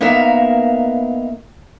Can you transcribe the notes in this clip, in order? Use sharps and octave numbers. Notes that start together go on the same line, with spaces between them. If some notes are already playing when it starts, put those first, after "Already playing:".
A#3 B3 D#4 A#4 E5 F5